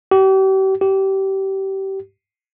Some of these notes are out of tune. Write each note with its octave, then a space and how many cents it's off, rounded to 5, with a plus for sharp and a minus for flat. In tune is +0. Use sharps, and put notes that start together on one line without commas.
G4 -40
G4 -25